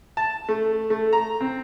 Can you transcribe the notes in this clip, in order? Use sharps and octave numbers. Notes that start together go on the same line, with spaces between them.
A5
A3
A3
A#5
C4